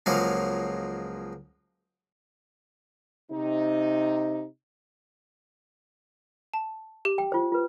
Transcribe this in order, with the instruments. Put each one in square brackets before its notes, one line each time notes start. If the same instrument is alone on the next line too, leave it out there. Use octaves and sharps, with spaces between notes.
[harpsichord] C#2 F3 F#3 G#3 A#3 F5
[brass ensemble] C3 D#4
[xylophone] A5
G4
[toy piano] G5
F4 C5
F4 B4